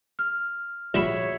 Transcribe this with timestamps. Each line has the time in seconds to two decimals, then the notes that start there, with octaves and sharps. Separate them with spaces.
0.19 F6
0.94 A#1 G3 F#4 G#4 C#5 E5 B5